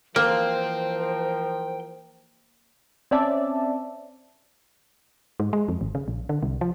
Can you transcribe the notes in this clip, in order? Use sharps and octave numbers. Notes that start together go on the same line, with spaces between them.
E3 F3 A#3 A#4 C5 G5 C6
C4 C#4 D5 E5 A5
G#2
G#3
F2
G#1
C#3
A#1
D3
C2
F3